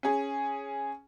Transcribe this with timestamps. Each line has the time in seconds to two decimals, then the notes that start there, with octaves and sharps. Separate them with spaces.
0.03 C#4 G#4